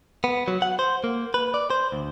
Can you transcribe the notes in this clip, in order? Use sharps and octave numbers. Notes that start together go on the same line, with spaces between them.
B3
F#3
F#5
C5
A#3
B4
D5
C5
D2